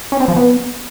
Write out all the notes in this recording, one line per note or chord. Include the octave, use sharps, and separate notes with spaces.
C#4
C4
F3
B3